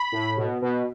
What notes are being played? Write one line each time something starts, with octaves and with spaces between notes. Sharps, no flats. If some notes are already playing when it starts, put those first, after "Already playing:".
Already playing: B5
A2
B2
B2